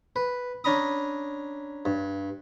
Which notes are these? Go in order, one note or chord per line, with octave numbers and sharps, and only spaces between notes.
B4
C#4 D4 A#5 B5 D#6
G2